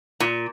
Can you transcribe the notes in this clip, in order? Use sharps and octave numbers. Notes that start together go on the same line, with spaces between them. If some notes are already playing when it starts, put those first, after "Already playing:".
A#2